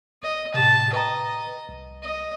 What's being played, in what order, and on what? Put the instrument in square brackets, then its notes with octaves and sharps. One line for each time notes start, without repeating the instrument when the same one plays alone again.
[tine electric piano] G1 [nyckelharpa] D#5
[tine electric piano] A2 C3 [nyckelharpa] G4 A5
[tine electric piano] B4 G5 A#5 [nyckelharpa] D#5
[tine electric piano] C2
[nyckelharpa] D#5